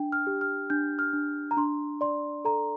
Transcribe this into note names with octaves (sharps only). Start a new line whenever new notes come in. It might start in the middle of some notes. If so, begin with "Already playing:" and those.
Already playing: D4 G5
F6
G4
F6
D4 G6
F6
D4
A#5
D4 C6
D5 C6
A4 A#5